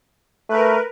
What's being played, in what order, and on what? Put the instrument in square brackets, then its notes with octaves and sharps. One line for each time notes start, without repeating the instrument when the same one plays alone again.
[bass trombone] A3 [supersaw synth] A#4 B4